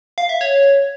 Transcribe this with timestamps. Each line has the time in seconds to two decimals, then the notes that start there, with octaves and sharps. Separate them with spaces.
0.18 F5
0.29 E5
0.41 C#5